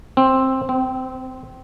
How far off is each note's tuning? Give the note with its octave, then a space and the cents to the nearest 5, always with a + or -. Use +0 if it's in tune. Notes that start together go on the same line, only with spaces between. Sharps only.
C4 +10
C4 -20